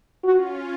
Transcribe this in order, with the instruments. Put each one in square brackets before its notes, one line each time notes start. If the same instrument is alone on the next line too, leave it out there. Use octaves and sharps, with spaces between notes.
[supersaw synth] C#4 F4 [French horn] F#4